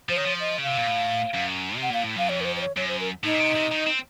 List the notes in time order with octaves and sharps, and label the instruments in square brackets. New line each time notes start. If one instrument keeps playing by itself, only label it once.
[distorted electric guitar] F3 [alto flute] C5
[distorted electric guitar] D#3 [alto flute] C#5
[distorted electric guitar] F3
[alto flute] D#5
[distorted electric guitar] C#3
[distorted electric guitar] C3 [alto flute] F5
[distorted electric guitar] A#2
A2
F#2
C3
[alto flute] F#5
[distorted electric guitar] A#2 [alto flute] F5
[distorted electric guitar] A2
[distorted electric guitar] F#2 [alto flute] F5
[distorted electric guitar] F2 [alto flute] C#5
[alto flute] A#4
C5
C5
C#5
[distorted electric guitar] F#2 [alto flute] C#5
[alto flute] C5
A#4
[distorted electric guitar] A2 [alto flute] D#4
[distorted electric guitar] A#2
C3
C3
D#3
C4